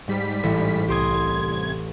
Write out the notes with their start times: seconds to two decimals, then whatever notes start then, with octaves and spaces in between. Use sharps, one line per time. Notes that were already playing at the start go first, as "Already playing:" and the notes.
0.08 G#2 G3 B6
0.43 A1
0.88 C2 G4 C6 D#6 G#6